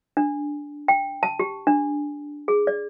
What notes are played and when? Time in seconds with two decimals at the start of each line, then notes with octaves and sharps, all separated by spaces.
0.17 D4
0.88 G5
1.23 A5
1.40 G4
1.67 D4
2.48 G#4
2.67 D5